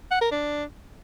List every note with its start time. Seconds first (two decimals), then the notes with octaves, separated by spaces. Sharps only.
0.11 F#5
0.21 A#4
0.31 D4